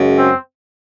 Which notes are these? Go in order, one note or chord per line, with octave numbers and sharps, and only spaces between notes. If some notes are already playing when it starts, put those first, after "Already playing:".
Already playing: F#2 C#3 G#3
C4